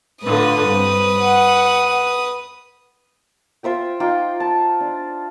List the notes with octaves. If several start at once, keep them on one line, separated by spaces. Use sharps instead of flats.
A2 D3 F4 B4 D#6
G2 C4
F#5
F4 C5 E5 G5
D#4 F4 G5 D6
A5
D4